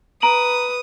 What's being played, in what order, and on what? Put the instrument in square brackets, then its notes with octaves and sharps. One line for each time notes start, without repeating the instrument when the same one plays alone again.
[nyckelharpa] B4 [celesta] A#5 D7 F#7 [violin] D#6